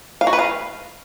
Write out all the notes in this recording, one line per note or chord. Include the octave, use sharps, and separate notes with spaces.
F5
F#4
B4
F5